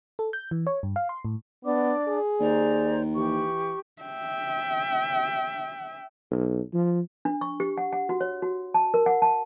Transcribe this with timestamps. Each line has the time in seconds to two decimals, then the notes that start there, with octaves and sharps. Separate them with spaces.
0.19 A4
0.33 G6
0.51 E3
0.67 C#5
0.83 G2
0.96 F5
1.09 C6
1.25 A2
1.65 B3 D4 D5 D6
2.08 G#4
2.40 D#2 C5 D5 A#5
3.15 E3 G4 C#6
4.02 E5 G5
6.31 B1
6.74 F3
7.25 D4
7.41 C#6
7.60 G4
7.78 F#5
7.93 F#5
8.09 F#4
8.21 C#5
8.42 F#4
8.74 A5
8.94 A#4
9.06 F#5
9.22 A5